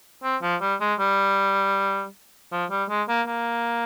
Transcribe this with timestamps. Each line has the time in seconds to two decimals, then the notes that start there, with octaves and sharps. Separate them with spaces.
0.23 C4
0.42 F3
0.61 G3
0.81 G#3
1.00 G3
2.52 F3
2.71 G3
2.89 G#3
3.09 A#3
3.27 A#3